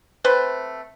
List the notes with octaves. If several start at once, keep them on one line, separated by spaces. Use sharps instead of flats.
A3 C4 B4 C5